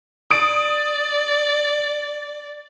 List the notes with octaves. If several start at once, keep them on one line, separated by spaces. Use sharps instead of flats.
D5 D#6 D7